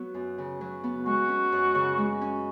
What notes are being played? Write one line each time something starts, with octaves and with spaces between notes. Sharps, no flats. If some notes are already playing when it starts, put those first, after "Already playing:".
Already playing: F#3 B3
F#2
C#3
F#3
B3
G#3 F#4
C#4
F#2
C#3
G#3
C#4